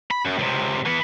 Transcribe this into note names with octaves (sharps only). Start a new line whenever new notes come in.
B5
F#2
C#2 C3
E3 B3